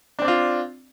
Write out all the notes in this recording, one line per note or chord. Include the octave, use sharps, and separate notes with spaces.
C4 D4 F4 D5